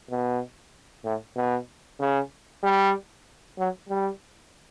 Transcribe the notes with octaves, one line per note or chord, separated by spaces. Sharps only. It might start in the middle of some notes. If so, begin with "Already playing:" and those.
B2
A2
B2
C#3
G3
F#3
G3